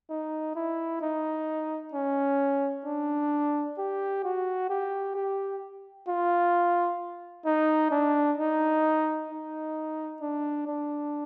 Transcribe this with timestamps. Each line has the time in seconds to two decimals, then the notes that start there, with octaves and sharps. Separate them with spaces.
0.09 D#4
0.55 E4
1.01 D#4
1.93 C#4
2.85 D4
3.78 G4
4.24 F#4
4.69 G4
5.15 G4
6.08 F4
7.45 D#4
7.91 D4
8.38 D#4
9.30 D#4
10.21 D4
10.67 D4